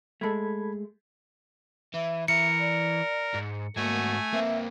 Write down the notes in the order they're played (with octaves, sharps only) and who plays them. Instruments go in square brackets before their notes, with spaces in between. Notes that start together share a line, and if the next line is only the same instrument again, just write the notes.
[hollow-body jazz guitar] G#3 A3 [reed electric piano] A4 B5 G#6
[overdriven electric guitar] E3 [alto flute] E5
[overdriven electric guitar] E3 [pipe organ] A#4 [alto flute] E5 [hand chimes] C#7
[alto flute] D5
[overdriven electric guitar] G#2
[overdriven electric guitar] G#2 F#4 [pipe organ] A3 G#5 [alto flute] A#3
[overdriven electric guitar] A#3 C4 [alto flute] E5